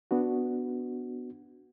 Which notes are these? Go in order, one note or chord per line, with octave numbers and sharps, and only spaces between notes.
B3 D4 F#4